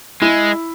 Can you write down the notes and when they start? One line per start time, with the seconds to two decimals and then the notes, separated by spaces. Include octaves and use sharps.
0.22 G#3 E4